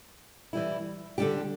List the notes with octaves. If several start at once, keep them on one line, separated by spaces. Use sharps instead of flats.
E3 G3 E4
D3 G3 D4 G4